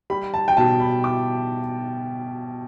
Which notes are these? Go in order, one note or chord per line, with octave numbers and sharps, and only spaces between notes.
G3 B5
A5
G5
B2 A5
B5
E4 D6